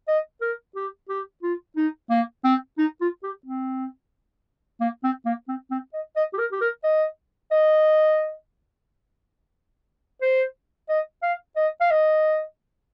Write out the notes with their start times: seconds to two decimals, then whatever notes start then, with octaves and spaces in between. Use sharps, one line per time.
0.08 D#5
0.41 A#4
0.76 G4
1.09 G4
1.43 F4
1.77 D#4
2.10 A#3
2.44 C4
2.78 D#4
3.01 F4
3.23 G4
3.46 C4
4.81 A#3
5.04 C4
5.26 A#3
5.48 C4
5.71 C4
5.93 D#5
6.16 D#5
6.33 G4
6.38 A#4
6.52 G4
6.61 A#4
6.84 D#5
7.52 D#5
10.22 C5
10.89 D#5
11.23 F5
11.56 D#5
11.81 F5
11.91 D#5